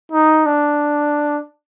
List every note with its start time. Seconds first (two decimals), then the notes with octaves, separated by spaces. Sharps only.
0.12 D#4
0.46 D4